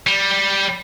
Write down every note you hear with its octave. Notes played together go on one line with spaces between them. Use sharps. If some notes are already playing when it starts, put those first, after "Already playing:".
G3